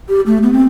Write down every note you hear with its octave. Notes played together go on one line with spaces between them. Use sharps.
G4
A3
B3
C4